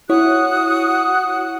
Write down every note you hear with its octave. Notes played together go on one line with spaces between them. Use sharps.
E4 F#4 C#5 D#6 F#6